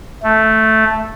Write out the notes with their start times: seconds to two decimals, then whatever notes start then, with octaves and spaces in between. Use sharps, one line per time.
0.23 A3